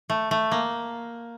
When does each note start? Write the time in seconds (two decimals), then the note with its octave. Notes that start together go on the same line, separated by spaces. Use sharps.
0.10 A3
0.31 A3
0.51 A#3